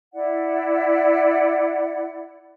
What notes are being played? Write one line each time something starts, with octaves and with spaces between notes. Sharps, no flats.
E4 D5 F#5